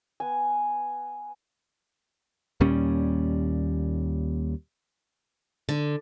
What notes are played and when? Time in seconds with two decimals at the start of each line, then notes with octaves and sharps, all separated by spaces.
0.20 B3 G#5
2.60 D#2 A#2 G3 C#4
5.69 D3